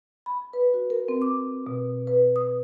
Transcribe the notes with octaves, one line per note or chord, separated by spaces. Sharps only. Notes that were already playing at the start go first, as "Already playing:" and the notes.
B5
B4
F#4
A#4
C4
D6
B2
B4
D#6